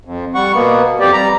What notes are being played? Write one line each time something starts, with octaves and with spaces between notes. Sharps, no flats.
F2
G3 F#5 C#6
B2 A#3 B3
F2 G4 D5
G3 A#5